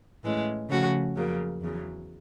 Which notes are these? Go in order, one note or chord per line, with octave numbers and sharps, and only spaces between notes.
A2 E3 G#3 C#4
C#3 F3 A3 C#4 F#4
F2 C#3 F#3 A#3
E2 C#3 F#3